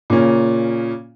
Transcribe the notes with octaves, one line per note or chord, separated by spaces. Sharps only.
A#2 C#3 A#3 C#4